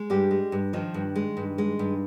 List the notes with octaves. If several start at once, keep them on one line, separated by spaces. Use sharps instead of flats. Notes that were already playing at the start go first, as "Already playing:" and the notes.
Already playing: G#3
G2 G3 G4
G#3
G2
D#3 F3 D#4
G2
G#3
G2
G#3
G2